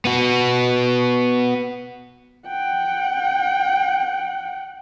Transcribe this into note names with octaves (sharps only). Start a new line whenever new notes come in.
B3 F#4
F#5 G5